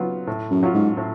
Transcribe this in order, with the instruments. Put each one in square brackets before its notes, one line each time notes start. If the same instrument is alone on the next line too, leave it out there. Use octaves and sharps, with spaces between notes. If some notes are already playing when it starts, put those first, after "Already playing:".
Already playing: [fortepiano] C#3 F#3 B3 F4
A2
[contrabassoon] F#2
[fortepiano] F#3 C#4 F4
[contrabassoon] G#2
[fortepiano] A2